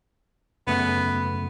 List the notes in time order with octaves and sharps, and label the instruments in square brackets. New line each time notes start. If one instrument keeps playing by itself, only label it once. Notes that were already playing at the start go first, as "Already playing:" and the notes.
[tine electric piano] F#2 C#3 A3 [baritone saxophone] B3